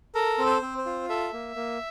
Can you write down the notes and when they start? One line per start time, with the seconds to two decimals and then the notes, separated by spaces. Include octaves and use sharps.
0.15 A4 A#4
0.38 C4
0.46 C5
0.62 C4
0.78 C5
0.86 F4
1.09 A4 E5
1.33 A#3
1.56 A#3